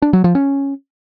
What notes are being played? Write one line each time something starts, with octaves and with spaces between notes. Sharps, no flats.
D4
F#3
F3
C#4